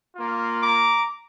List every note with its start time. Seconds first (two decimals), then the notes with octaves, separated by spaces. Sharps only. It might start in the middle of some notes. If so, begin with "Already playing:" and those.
0.15 A#3 F4
0.61 A#5 D6